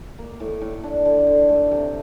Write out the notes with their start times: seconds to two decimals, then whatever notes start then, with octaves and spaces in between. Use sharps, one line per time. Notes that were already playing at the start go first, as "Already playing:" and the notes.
0.18 A#3
0.40 A2
0.61 A2
0.83 D4
1.05 D3
1.27 D3
1.49 A3
1.71 C3